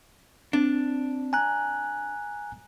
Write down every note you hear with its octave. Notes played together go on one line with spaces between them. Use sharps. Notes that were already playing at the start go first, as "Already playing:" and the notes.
C4 D4
G#5 A#5 F#6